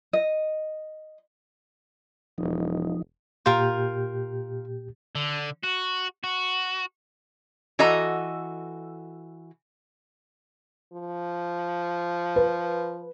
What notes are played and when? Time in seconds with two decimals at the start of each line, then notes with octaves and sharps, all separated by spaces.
0.13 D#5
2.38 E1 F3 D#4
3.46 A#2 F4 G4 A#4 G6
5.16 D3
5.63 F#4
6.24 F#4
7.79 E3 F#4 A4 D#5 A#5
10.93 F3
12.36 B4